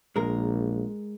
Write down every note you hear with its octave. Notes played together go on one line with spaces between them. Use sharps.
A#1 G#3 A#4